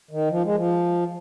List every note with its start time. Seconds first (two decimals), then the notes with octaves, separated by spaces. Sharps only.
0.11 D#3
0.30 F3
0.43 G#3
0.55 F3